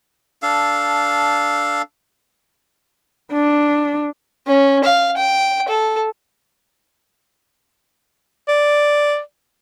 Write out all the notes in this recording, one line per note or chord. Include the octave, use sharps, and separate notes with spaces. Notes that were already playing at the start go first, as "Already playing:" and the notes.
D4 A4 F5
D4
C#4
F5
G5
A4
D5